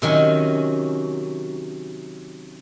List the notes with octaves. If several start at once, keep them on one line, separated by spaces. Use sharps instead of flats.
C3 D#3 F#3 C#4